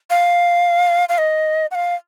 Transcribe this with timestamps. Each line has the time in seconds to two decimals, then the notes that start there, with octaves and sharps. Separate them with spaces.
0.10 F5
1.09 F5
1.18 D#5
1.71 F#5
1.75 F5